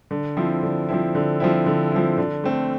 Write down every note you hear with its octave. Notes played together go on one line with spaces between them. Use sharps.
D3
F3 C4 E4
D3
F3 C4 E4
D3
F3 C4 E4
D3
F3 C4 E4
D3
A3 C4